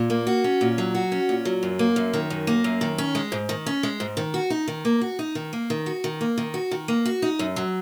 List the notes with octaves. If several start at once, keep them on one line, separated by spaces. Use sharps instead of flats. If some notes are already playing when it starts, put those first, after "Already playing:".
Already playing: A#2
A#3
F#4
C#4
A#2
F#3
F#4
C#4
A#2
F#3
F#2
A#3
F#2
D#3
F#2
A#3
F#2
D#3
C#4
G#3
G#2
D#3
C#4
G#3
G#2
D#3
F#4
D#4
D#3
A#3
F#4
D#4
D#3
A#3
D#3
F#4
D#3
A#3
D#3
F#4
D#3
A#3
F#4
D#4
F#2
F#3